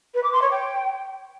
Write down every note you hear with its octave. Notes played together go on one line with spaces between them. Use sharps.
B4
D6
C6
C#5
G5